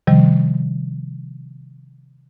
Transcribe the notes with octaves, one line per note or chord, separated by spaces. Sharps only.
C3 D#3 F3 G3